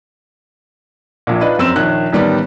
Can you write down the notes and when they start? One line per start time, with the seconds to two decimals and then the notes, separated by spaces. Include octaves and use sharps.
1.27 A#1 A#2
1.41 D4 D#4 F4 B4
1.58 F1 F#2 C4 E6 E7
1.76 A#1 D#3 C#5 F#6
2.13 A1 D#3 G3 B3 D5